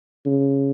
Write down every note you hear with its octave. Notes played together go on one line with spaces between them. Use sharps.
C#3